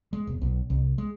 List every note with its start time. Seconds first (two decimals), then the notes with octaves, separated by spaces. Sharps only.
0.13 G#3
0.27 E1
0.41 B1
0.70 C2
0.98 G#3